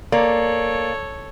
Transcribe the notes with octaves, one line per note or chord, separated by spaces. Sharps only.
A#3 A4 C#5 D5